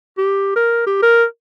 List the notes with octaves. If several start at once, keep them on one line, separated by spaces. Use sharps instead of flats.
G4
A#4
G4
A#4